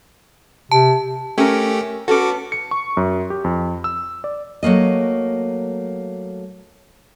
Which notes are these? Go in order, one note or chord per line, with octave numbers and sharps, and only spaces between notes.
C3 A5
A3 C#4 G4 A#4
B3 C#4 F#4 A4 D6
C#7
C#6
F#2
G4
F2
E6
D5
F#3 A3 A#3 D#5